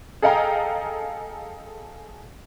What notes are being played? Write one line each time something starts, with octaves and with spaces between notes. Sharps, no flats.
G#4 A4 D#5 F5 G5 A#5